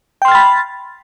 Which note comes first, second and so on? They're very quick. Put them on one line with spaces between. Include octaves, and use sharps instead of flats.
G5 C6 F6 A6 B5